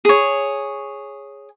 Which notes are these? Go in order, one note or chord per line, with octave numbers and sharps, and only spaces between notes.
G#4 C#5